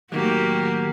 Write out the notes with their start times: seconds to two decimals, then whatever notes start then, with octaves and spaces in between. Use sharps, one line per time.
0.12 A2 D#3 F#3 A#3 F#4 G4